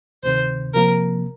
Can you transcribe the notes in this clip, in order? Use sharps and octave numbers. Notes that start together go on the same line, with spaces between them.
D2 C3 D#3 C5
C3 F3 A#3 A#4